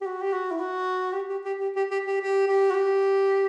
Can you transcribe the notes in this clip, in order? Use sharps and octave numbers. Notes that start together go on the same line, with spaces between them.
G4
F#4
G4
F#4
E4
F#4
G4
G4
G4
G4
G4
G4
G4
G4
G4
F#4
G4